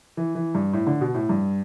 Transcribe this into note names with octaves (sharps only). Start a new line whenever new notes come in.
E3
E3
G2
A2
D3
B2
A2
G2